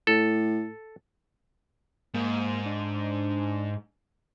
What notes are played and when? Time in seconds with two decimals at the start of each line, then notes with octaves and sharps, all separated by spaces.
0.07 A2 A4
2.14 G#2 A#3
2.66 D4